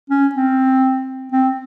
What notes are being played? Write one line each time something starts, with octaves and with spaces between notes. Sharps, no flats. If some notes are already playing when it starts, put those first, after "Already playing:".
C#4
C4
C4